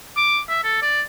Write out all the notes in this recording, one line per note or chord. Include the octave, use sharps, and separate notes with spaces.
D6
E5
A4
D5